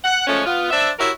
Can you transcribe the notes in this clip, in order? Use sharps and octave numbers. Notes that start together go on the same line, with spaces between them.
F#5
F3 G#3 A3 C#4
B3 F4
D4 C5 E5
E4 F#4 G4 A#4 C#5